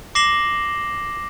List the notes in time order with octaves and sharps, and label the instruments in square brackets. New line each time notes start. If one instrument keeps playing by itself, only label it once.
[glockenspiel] D6 A#6 C7 E7 F#7 G7